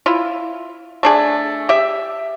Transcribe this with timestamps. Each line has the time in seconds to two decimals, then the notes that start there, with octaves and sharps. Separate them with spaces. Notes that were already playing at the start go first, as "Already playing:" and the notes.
0.06 E4 F4
1.03 A3 D4 G#4
1.69 G4 E5